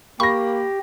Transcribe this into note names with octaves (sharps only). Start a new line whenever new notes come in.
A#3 G4 B5 C#6 A#6